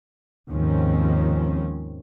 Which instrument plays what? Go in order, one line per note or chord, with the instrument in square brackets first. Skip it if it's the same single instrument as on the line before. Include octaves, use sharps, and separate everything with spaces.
[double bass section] D#2 G#2 D#3 F3 C4 C#4